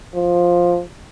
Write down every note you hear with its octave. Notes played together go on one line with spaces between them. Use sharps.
F3